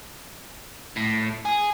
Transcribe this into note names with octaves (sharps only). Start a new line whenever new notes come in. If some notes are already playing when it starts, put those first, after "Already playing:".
A2
G#4